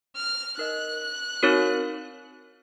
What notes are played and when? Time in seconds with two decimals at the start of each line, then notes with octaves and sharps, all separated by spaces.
0.16 F6
0.58 D#4 A#4 D#5 F#6
1.43 C4 D#4 F#4 A#4 C#5